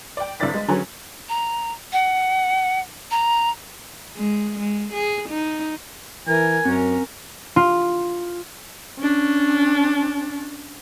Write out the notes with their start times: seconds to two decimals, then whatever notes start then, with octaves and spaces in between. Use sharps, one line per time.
0.17 D5 G5
0.40 G#1 D3 E4 D5 A6 B6
0.54 G#3
0.68 D3 F#3 C#4 G#4 B4 C#5
1.29 A#5
1.93 F#5
3.11 A#5
4.17 G#3
4.60 G#3
4.93 G#4
5.29 D#4
6.27 E3 A#4 G#5
6.65 F#2 C4 C#4 A#4
7.56 F4
9.00 C#4 D4